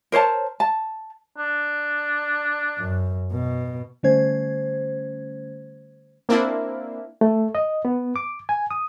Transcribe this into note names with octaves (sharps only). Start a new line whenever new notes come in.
A#4 C5 C#5 A5
A5
D4
F#2
B2
D3 G3 A3 C#4 C5 G#6
A#3 C4 D4 E4
A3
D#5
B3
D6
G#5
D#6